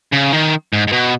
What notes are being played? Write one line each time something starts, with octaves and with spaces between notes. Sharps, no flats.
C#3
D#3
G#2
G#2
B2